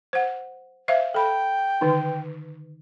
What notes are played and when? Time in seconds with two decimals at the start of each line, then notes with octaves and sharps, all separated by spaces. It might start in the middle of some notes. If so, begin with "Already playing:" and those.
0.13 C5 F#5
0.88 C5 E5 F5
1.14 A4 G5 B5
1.81 D3 D#3 D#4